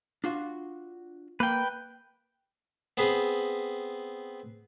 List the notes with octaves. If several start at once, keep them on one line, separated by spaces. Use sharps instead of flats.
D4 F4 F#4
A#3 B4 G5
B3 C4 G#4 B4